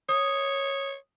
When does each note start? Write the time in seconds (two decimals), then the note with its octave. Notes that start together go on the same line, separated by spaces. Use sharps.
0.09 C#5 D#6